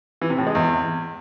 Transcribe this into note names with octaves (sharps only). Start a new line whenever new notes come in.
E3
C3
A2
G#3
E2